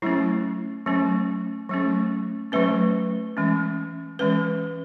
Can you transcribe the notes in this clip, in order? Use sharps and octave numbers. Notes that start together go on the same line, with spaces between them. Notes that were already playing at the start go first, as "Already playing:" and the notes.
F#3 A3 C#4 E4
F#3 A3 C#4
F#3 A3 C#4
F#3 A3 C#4 B4
E3 G#3 C#4
E3 G#3 C#4 B4